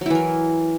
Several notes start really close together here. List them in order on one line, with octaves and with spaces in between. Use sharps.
F#3 E4 E3 A#4